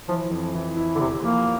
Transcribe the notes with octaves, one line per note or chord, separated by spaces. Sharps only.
E3 F3
F2
E3
E4
D3
E2 C3
F3 A#3